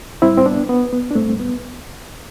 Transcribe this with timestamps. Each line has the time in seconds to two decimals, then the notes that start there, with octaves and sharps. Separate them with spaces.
0.22 A2 G3 C4 E4
0.37 C4
0.46 B3 D4
0.69 B3
0.93 B3
1.11 D4
1.15 A2 G3 A3 C4
1.40 B3